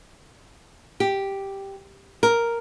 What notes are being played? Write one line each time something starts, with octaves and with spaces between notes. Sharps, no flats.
G4
A#4